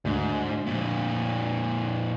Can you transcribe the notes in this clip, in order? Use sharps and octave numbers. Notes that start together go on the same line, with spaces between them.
D2 G#2
F2 A#2